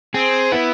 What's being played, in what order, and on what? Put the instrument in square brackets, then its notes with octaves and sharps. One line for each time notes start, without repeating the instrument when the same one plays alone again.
[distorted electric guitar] C4 [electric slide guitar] G#4
[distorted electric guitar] B3 [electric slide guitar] E4